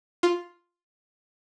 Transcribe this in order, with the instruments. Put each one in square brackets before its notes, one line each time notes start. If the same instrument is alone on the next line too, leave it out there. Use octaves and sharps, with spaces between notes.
[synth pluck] F4